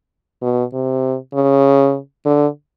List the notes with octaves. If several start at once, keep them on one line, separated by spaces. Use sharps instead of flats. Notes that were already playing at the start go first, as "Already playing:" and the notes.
B2
C3
C#3
D3